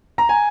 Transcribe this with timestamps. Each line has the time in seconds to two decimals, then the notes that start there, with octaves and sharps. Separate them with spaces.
0.18 A#5
0.29 G#5